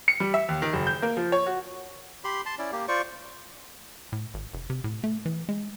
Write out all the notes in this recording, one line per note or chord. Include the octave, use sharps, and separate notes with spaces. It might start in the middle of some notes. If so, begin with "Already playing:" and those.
C#7
G3
E5
D#2
D#3
F#1
G6
A#3
F3
C#5
F#4
G4 B5 C6
A5 C6
C#4 E4 D5
A#3 G4
F4 C5 D5 C#6
A2
G#1
F1
C3
A2
A3
E3
G#3